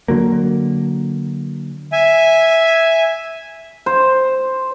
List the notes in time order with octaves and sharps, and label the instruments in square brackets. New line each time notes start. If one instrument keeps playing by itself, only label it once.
[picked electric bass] D3 F#3 A#3
[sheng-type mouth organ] E5 G#5
[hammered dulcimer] C5